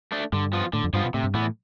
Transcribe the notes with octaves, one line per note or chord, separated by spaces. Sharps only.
A3 D4
G2 D3
F3 B3 F4
A2 D3
F2
G2 F3 B3 F4
B2
A2 C3
G2
A2 E3 B3